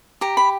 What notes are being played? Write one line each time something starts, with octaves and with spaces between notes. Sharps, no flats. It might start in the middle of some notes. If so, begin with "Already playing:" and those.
G4 A#5
B5